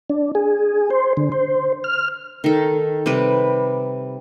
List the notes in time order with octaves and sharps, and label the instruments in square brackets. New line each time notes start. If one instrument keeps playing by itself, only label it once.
[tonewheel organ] D4
G#4
C5
D3
C5
F6
[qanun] D#3 A4
C3 G3 B4